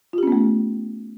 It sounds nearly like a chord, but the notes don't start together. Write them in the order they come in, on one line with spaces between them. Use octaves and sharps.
F4 G4 C#4 B3 A3